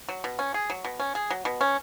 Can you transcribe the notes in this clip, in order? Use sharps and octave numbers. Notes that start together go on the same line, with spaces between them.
F#3
B2
C#4
G#4
F#3
B2
C#4
G#4
F#3
B2
C#4